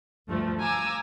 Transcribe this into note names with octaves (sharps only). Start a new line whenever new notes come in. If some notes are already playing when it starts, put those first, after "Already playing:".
D2 G2 F3 A3
F5 G#5 A#5 D6 E6